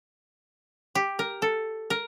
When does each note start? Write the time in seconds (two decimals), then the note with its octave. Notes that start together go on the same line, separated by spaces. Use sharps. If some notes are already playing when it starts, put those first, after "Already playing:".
0.95 G4
1.19 A#4
1.42 A4
1.90 A#4